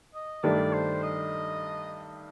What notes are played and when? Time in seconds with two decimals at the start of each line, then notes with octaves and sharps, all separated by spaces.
0.14 D#5
0.43 G2 D#3 A3 D4 D5
0.73 C5
1.03 D#5